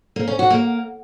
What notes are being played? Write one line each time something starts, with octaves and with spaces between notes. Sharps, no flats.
A#3
C#4
F#4
A#3